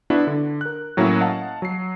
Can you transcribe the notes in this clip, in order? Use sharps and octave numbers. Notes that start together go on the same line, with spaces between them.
B3 D4 E4 F#4 B4
D3
A#4 F#6
A2 F#3 A#3 C#4 E4 F#4
D#5 F5 F#5 A5
F#3 C7